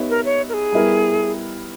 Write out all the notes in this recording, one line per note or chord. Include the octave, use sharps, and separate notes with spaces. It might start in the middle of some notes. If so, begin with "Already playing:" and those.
Already playing: B3 D#4 G4 C#5 E5
A#4
C#5
A#4
G#4
G3 B3 E4 A#4